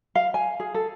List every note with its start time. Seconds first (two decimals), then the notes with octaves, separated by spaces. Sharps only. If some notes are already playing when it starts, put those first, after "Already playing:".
0.15 F5
0.34 G#5
0.60 G#4
0.74 A4